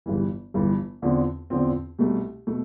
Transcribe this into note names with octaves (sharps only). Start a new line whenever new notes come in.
G1 G2 E3
G1 G2 E3
E2 D3 F3 C4
E2 D3 F3 C4
C2 B2 A3
B2 A3